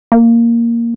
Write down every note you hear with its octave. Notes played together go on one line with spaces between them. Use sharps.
A#3